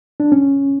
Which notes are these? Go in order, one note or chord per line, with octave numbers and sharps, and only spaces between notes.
D4
C#4